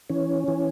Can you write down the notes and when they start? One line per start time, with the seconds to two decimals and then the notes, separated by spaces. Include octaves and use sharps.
0.09 E3 C#4
0.48 E3